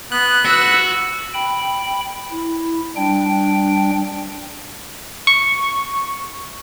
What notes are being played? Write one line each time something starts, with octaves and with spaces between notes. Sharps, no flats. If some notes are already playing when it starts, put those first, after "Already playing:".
B3 F#6
F#4 B4 E6
G5 B5
E4
G3 D4 G5
C#6